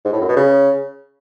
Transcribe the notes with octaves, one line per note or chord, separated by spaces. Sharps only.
G#2
A2
F#2
B2
C#3